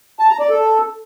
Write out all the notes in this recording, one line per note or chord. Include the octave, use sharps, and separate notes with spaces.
A5
A#5
D5
A4